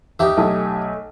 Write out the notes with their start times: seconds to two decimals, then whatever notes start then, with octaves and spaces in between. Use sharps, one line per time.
0.19 D#2 D#4 G4 E5
0.37 B1 A3 G#5